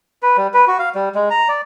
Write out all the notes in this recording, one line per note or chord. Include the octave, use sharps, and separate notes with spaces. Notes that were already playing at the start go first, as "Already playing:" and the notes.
B4
G3
B4
F#4
F5
G3
G#3
A#5
D5